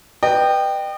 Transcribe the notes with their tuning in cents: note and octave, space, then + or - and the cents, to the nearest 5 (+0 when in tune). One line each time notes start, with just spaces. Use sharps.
B4 +0 D#5 -35 G5 +0